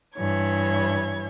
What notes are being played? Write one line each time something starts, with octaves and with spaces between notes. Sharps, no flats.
G2 E3 C#5 G#6